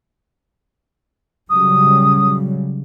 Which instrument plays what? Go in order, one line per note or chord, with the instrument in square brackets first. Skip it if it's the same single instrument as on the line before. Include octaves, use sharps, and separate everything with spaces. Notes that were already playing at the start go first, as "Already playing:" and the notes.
[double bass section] C#3 F#3 G3 [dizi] D#6